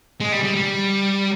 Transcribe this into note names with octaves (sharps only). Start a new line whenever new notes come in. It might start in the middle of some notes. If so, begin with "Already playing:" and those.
G#3
G3
G3
G3